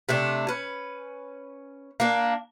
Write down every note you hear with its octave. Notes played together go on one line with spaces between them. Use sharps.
C3 A3 D4
C#4 B4
A#3 D4